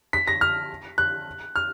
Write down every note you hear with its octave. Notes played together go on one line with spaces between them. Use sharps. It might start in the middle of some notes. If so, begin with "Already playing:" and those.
B6
A#6
F6
F#6
F6